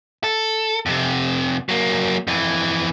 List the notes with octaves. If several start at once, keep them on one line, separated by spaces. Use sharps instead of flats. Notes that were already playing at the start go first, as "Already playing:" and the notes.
A4
F2 C3
F#3 A#3
F2 E3